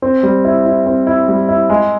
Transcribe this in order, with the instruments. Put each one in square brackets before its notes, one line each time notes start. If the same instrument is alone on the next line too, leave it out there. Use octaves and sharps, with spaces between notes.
[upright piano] C4
G3
E4
E4
C4
E4
G3
E4
G#3